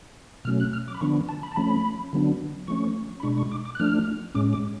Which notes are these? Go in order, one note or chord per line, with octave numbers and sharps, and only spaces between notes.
B2 F#3 A3 C#4 F6
F#6
F6
D6
B5
D3 F3 B3 D4 C#6
A5
B5
A5
F3 A3 C#4 B5
D3 F#3 B3 D4
F3 A3 C#4 C#6
B5
B2 G#3 D4 C#6
C#6
D6
D6
F#6
F3 A3 D4 F6
A2 G#3 C#4 D6
D6